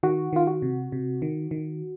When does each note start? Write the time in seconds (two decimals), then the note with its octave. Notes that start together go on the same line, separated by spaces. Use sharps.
0.03 D#3 F#4
0.33 D#3 F4
0.47 F#4
0.62 C3
0.92 C3
1.22 D#3
1.51 D#3